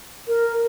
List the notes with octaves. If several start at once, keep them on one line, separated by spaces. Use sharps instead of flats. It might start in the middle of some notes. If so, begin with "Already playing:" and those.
A#4